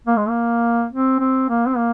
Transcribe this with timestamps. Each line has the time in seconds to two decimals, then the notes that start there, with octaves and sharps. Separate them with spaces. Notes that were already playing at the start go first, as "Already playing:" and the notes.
0.07 A#3
0.17 G#3
0.29 A#3
0.93 C4
1.20 C4
1.49 A#3
1.67 C4
1.77 A#3